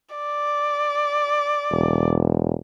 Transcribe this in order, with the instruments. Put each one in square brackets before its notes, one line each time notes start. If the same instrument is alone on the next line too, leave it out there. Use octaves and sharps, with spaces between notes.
[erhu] D5
[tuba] E1